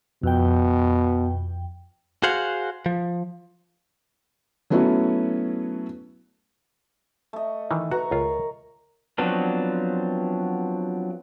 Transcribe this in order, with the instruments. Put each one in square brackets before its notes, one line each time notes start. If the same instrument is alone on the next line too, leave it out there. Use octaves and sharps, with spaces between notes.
[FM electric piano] F2 G5 [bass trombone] B2
[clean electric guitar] F#4 G#4 C5 F5 F#5
F3
[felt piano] F#3 A3 B3 C#4 E4 F#4
[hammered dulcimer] A3 D#5
[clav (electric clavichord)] D#3 E3
[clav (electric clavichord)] F#4 [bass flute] B4 [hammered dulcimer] A#5 C#6
[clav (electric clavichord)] C#2 F4 [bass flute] A#4
[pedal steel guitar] F3 F#3 B3 C4 D4